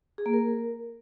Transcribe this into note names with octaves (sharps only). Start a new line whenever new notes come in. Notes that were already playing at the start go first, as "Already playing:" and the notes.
G#4
A#3
A#4